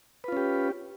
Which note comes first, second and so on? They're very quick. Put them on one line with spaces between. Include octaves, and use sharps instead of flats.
B4 F4 C#4 G4